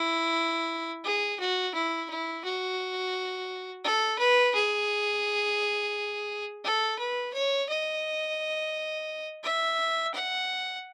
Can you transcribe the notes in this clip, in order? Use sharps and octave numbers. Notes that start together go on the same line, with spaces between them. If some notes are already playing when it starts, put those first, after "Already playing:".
Already playing: E4
G#4
F#4
E4
E4
F#4
A4
B4
G#4
A4
B4
C#5
D#5
E5
F#5